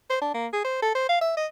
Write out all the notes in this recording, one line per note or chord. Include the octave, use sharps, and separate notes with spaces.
C5
D4
A#3
G#4
C5
A4
C5
F5
E5
D#5